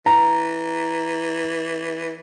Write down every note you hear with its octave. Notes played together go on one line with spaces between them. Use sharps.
E3 A#5